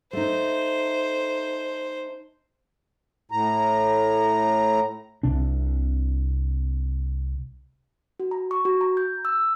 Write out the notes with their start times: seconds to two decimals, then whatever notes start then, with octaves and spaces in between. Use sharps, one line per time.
0.13 A3 D#4 C5
3.31 A2 A#5
5.23 C2 C3 D4
8.20 F#4
8.31 A#5
8.51 C#6
8.65 F#4
8.81 A#5
8.97 G6
9.25 E6